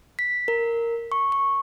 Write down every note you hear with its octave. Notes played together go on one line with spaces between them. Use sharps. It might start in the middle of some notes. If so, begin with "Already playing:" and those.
B6
A#4
C#6
C#6